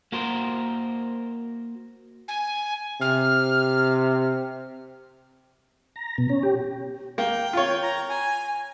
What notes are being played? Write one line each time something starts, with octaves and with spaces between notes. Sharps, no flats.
A#3 F#4 A#4 C5
G#5
C3 F6
A#5
B2
C#4
G4
A#3 G5
F4 C#5
A#5
G#5